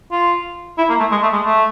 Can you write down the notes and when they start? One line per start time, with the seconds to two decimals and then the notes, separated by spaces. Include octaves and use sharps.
0.12 F4
0.78 E4
0.89 A#3
1.00 A3
1.11 G#3
1.23 A3
1.33 G#3
1.43 A3